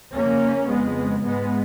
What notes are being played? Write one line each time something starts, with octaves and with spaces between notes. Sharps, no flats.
F2 C#3 A#3 C#4
F2 C#3 G#3 B3
G#2 G#3 B3